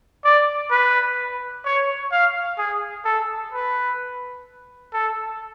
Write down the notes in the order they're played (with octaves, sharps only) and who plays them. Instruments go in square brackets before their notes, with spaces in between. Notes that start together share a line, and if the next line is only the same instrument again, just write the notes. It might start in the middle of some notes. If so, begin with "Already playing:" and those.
[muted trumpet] D5
B4
C#5
F5
G#4
A4
B4
A4